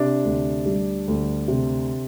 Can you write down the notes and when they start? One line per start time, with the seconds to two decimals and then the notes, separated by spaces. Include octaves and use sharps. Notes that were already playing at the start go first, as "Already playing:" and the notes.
Already playing: C3 D4 D5
0.24 D2
0.66 G3
1.08 D2
1.48 C3